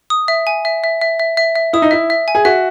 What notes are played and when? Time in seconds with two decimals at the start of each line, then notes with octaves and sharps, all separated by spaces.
0.10 D#6
0.28 E5
0.47 G#5
0.65 E5
0.84 E5
1.01 E5
1.19 E5
1.37 E5
1.56 E5
1.73 E4 D#6
1.82 D#4
1.91 E4 E5
2.10 E5
2.28 G#5
2.35 G#4
2.45 F#4 E5